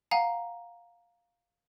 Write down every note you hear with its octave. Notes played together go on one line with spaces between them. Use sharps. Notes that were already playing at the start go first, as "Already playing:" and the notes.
F5 F#5 G#5 A#5